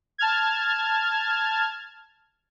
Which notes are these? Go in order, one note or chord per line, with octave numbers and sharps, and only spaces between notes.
A5 F6 G#6